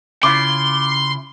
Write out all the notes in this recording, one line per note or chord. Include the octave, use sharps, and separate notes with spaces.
C#3 E4 F4 C6 D6